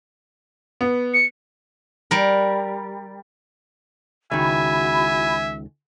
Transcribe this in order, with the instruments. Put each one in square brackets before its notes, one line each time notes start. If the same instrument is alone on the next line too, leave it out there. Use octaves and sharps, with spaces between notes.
[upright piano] B3
[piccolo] C#7
[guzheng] G3 A#4
[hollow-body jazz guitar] C#2 D#3 [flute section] E4 F#4 B5 [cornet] E5 [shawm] G#5